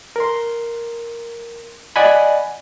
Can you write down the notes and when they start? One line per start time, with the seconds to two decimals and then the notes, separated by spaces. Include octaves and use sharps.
0.16 A#4 C6
1.96 D5 D#5 F#5 G#5 B5